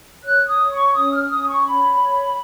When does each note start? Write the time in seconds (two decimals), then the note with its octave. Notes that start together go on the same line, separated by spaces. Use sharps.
0.24 C#5 F#6
0.48 D#6
0.60 C#5
0.71 C#6
0.94 C#4 D#6
1.12 F6
1.30 C#4 D#6
1.48 C#6
1.65 C#5 B5
2.01 C#5